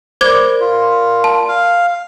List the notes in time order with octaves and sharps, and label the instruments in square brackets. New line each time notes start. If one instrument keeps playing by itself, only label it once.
[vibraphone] A#4 D5 B5 [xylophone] C5 D6 G#6
[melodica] F4
[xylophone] A5
[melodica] F5